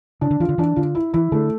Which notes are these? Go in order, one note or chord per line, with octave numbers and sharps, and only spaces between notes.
C#3 D4
D3
E3 F4
D3
E3 D4
D3 F4
E4
E3 E4
D3 A3